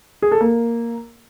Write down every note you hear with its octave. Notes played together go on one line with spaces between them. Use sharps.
G#4
A4
A#3